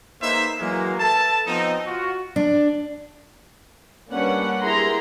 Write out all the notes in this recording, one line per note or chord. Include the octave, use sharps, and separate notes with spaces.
A#3 D#4 G#4 B4 C5 E5
E3 F#3 G#3 A#3
A4 B4 E5 A5
F3 B3 C4 D#4
F4 F#4
D4
G3 A#3 C#4 D4 B4 F#5
E4 G4 G#4 A#4 A#5 C6